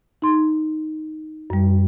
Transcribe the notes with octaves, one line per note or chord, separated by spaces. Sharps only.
D#4 C6
F#2 G3